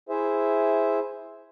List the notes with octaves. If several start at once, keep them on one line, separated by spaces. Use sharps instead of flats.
E4 G#4 C5 E5